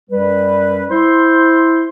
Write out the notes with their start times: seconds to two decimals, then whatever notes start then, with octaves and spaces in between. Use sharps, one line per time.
0.10 F#2 G3 B4
0.90 E4 C5 C6